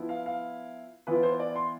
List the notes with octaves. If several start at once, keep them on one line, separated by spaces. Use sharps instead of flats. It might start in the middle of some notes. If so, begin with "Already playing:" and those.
Already playing: F3 B3 E4
F5
F5
E3 B3 F4 B4
C5
D5
C6